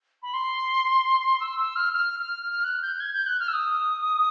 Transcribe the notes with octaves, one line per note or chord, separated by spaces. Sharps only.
B5
C6
E6
E6
F6
F6
F6
F6
F#6
G6
G#6
G6
F#6
F6
E6
D#6